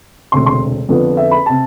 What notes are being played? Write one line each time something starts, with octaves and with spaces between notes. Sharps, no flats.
E1 D2 C3 C6
C6
F2 D3 F3 B3
E5
B5
C3 A5